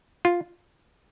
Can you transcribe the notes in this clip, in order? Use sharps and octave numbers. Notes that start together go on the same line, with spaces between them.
F4